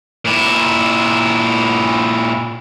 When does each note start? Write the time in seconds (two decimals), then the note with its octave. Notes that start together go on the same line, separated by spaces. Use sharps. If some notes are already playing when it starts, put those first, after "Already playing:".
0.25 A#2 E4